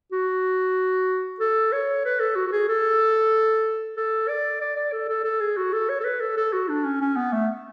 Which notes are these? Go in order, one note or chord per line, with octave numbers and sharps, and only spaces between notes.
F#4
A4
C#5
B4
A4
F#4
F#4
G#4
A4
A4
D5
D5
D5
A4
A4
A4
G#4
F#4
A4
C#5
A4
B4
A4
A4
F#4
D4
C#4
C#4
B3
A3